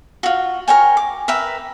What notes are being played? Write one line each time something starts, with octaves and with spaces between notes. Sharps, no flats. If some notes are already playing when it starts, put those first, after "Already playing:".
F4 F#4
A#4 C#5 G5 G#5
D6
A#4 B4 E5 G5